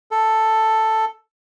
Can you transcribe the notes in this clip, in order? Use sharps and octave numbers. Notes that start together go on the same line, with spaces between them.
A4